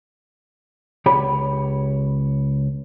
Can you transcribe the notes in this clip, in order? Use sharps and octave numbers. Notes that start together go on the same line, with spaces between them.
C#2 G4 C#5 B5